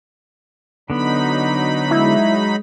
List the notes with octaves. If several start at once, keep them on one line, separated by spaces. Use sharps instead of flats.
D3 F#3 B3 D#4 B5
G#3 E4